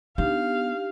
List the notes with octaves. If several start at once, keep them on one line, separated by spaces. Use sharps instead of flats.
B3 D4 D#4 G4 F5